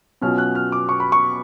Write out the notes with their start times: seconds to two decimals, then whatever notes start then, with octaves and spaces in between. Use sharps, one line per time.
0.21 B2 F#3 C#4 F4 F6
0.38 F#6
0.55 F6
0.72 D6
0.89 C#6
1.00 B5
1.12 C#6